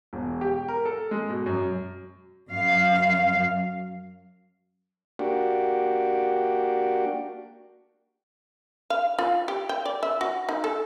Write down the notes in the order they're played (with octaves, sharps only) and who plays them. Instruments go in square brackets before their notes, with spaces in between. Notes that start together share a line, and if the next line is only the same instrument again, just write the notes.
[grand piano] E1
G4
A#4
A4
G#3
B2
F#2
[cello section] F#2 F5
[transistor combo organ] A#3 D4 F#4 G4
[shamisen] F5
F4
G4
G5
D5
E5
F#4
D#4
A4